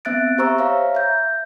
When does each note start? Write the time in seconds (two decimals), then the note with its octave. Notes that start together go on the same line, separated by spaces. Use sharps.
0.05 B3 C4 E5 F#6 A6 D7
0.38 G4 C5 E5 A#5 C#6 E6
0.58 C#5 F5 A#5
0.95 E5 G6